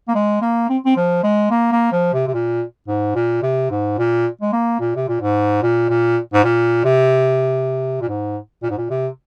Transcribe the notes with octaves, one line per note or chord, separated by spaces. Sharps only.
A#3
G#3
A#3
C4
C4
F3
G#3
A#3
A#3
F3
C3
C3
A#2
G#2
A#2
C3
G#2
A#2
G#3
A#3
A#2
C3
A#2
G#2
A#2
A#2
G#2
A#2
C3
A#2
G#2
A#2
G#2
A#2
C3